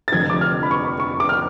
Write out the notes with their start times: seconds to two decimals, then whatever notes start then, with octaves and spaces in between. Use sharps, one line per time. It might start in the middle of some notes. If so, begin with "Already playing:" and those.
0.08 A6
0.12 F1 F2 D3 F3 G#6
0.30 D6
0.41 F6
0.63 B5
0.71 C#6
1.00 C#6
1.20 D6
1.29 F6